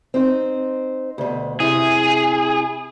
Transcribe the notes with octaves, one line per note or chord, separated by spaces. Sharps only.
C4 D#4 C5
D2 B2
C3 E4 G#4